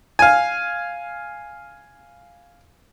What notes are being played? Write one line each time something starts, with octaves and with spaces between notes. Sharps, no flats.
F5 G#5